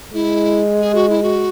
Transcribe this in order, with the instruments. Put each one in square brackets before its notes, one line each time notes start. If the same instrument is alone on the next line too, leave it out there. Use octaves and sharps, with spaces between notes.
[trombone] G#3 [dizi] E4
[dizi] G#4
F#4
E4
F#4